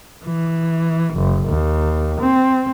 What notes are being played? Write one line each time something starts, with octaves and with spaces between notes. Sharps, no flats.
E3
F#1
D#2
C4